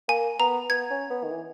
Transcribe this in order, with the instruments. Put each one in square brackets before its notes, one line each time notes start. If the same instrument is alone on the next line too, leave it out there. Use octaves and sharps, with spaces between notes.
[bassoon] A#3 [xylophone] G#5
[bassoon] B3 [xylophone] A#5
[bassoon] B3 [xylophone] G#6
[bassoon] C#4
B3
D#3
E3